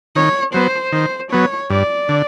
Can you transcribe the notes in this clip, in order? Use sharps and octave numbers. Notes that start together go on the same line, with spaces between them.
D#3 C#5
F#3 B3 C5
D#3 C5
F#3 B3 C#5
G2 D5
D3